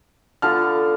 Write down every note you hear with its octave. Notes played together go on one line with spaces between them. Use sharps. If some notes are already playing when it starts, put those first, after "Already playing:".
D3 B3 F4 A5 F6